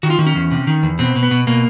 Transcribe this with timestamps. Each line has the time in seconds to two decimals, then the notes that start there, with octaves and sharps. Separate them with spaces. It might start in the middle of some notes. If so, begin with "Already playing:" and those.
0.03 D#3 F#4
0.10 F4
0.19 D#3 F#4
0.27 C#4
0.36 E2
0.52 C3
0.67 D#3
0.83 E2
0.99 B2 C4
1.16 B2
1.23 B3
1.31 B2
1.47 B2 A#3